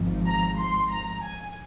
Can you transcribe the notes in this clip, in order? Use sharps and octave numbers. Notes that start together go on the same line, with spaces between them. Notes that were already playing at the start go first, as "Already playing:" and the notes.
Already playing: G#1 G#2 F3
A#5
C6
A#5
G#5